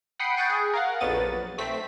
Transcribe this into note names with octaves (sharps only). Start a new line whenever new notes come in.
F#5 G5 B5 D#6 F#6 C7
G5 C#6 D#6 F#6 G6 A6
G#4
A#4 F5 F#5
A#1 F2 F#3 B3 A6 D#7
B1 A3 C4 B6